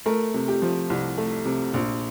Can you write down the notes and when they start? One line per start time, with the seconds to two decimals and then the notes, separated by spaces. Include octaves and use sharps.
0.06 A3 A#4
0.34 C3
0.48 G4
0.62 F3
0.90 C2
1.18 A3
1.45 C3
1.74 A#1